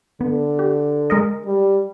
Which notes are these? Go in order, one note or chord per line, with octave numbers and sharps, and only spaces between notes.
D3 B3
G4
G#3 A#4 D#5
G3